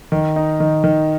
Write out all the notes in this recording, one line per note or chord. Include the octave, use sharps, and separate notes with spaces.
D#3
D#4
D#3
D#3